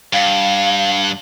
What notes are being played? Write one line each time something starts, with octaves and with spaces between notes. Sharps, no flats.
G2 F5